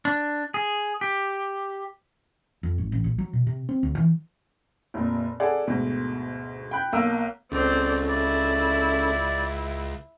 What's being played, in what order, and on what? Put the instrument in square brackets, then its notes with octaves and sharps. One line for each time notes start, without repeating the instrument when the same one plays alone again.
[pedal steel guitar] D4
G#4
G4
[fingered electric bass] F2
G#1
A1
A#1
F#3
B2
C3
C4
D2
E3
[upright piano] F1 A#2
G#4 A4 D5 F#5
D2 G#2 B2
G5 B5 F#6 G6
B1 A#3 F5 A#5 E6 D7
[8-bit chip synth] C#2 [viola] C4 D5 [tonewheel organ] C#4 A4
[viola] E4 [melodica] D5